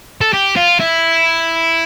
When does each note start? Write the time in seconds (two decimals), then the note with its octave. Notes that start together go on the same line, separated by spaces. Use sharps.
0.21 A4
0.33 G4
0.56 F4
0.80 E4